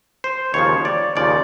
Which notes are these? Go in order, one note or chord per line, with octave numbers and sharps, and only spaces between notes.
C5
D#2 C#3 F3 C#5
D5
D#2 C#3 F3 D5